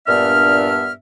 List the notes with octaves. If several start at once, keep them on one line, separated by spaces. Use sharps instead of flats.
G2 A#2 B3 D4 E5 F6